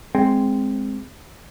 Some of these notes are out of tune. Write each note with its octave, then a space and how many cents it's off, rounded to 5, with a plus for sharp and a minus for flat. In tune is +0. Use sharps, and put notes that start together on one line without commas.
G#3 +0 C4 +0